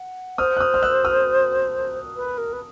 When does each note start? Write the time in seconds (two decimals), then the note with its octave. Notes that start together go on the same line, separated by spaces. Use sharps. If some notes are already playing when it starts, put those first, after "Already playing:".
Already playing: F#5
0.38 C5 D#6 F6
0.57 F#6
0.60 D#6 F6
0.74 F6
0.82 E6 F#6
1.05 D#6 F6
2.16 B4
2.38 A#4
2.53 B4